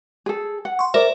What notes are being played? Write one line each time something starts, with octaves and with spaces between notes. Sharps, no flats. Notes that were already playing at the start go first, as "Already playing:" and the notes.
G#4 A4
F#5
C6 C#6
A#4 C5 D5 E5